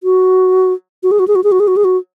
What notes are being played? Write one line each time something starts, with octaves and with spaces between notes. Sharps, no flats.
F#4
F#4
G#4
F#4
G#4
F#4
G#4
F#4
G#4
F#4
G#4
F#4